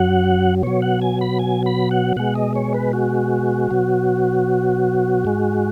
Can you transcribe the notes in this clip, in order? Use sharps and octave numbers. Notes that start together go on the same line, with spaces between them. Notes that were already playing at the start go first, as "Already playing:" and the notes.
Already playing: F#2 F#3 F#5
B2 F#3 C#5
F#5
G#5
B5
G#5
B5
F#5
B2 G#3 F#5
D#5
C#5
B4
F#4
B2 F#3
G#2 G#3